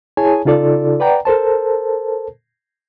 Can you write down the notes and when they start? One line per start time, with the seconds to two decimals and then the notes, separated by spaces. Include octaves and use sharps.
0.17 E4 G#4 C#5 G#5 A5
0.45 C#3 D#4 F4 A4 D5
1.00 B4 D5 F#5 G5 A#5
1.25 A4 A#4 C5 A5